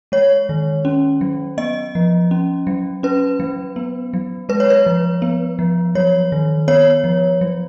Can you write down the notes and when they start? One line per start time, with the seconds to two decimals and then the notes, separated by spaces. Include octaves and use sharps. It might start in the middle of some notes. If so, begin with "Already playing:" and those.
0.12 G#3 C#5
0.49 D#3
0.85 C#4
1.21 F#3
1.58 B3 D#5
1.95 F3
2.31 C#4
2.67 F#3
3.03 C#4 B4
3.40 F#3
3.76 B3
4.14 F#3
4.49 G#3 B4
4.60 C#5
4.70 B4
4.86 F3
5.22 B3
5.59 F3
5.95 F#3 C#5
6.32 D#3
6.68 B3 C#5
7.04 F3
7.41 F#3